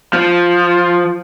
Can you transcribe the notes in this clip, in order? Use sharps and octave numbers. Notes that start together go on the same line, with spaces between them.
F3